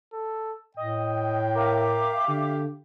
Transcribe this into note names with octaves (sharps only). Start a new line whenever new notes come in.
A4
A2 D#5 G5
A#4 E5 F5 D6
D3 G4